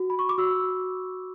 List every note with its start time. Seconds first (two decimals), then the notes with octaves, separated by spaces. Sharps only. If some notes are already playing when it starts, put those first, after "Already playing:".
Already playing: F#4
0.10 B5
0.19 C#6
0.29 D6
0.38 F#4 E6